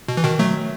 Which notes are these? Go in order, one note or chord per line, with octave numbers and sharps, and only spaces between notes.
B2
E3
B2 D#3
F#3 A3